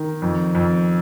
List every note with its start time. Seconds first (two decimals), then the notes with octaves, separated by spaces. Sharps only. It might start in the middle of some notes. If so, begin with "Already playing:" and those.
Already playing: D#3
0.22 F2
0.55 F2